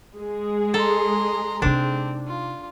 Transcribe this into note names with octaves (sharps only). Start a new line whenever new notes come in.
G#3 G#4
A4 A#5 C6
C3 C4 D4 D#4
F4